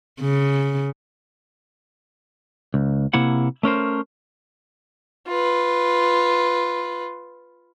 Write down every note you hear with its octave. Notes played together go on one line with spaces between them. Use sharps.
C#3
C#2
C3 A#3 E4 F#5
A3 C#4 A#4 C5
F4 B4